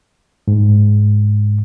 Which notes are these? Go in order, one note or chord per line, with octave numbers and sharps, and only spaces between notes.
G#2